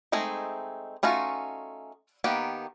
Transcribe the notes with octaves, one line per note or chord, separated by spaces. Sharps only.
G#3 A3 C4 D#4 G#4
A3 C#4 D#4 F4 F#4
D#3 A#3 B3 G4